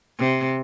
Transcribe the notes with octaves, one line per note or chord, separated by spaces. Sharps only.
C3